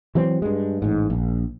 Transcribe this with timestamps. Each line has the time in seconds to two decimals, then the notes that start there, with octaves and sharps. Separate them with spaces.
0.15 E3 F#3 C4
0.42 G2 G#3
0.82 A1 G#2
1.10 A#1